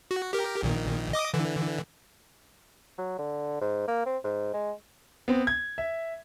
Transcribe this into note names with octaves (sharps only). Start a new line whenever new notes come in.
F#4
G4 A#4
A#1 A#2 D#3
D#5 D6 D#6
D3 E3
F#3
D3
G#2
A#3
C4
G#2
G#3
B3 C4
G#6
E5